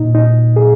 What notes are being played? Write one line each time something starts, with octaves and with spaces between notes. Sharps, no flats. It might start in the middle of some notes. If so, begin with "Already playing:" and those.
Already playing: A#2 D#4
D#4
G#4